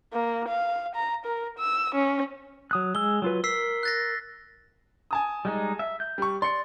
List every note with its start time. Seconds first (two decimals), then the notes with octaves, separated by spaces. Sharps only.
0.13 A#3
0.48 F5
0.95 A#5
1.25 A#4
1.59 E6
1.95 C#4
2.71 F#3 D#6 F#6
2.95 G#3 E6 G7
3.22 F#3 F4 B4
3.44 A#4 E6 B6 C7
3.83 F#6 A6 A#6
5.11 G#5 A5 D#6
5.45 G3 G#3 D#4
5.79 E5
6.00 G6
6.18 G3 C#6
6.42 D5 C6 C#7